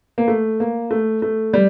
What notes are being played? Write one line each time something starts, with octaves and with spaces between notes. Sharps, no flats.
A#3
A3
A#3
A3
A3
G3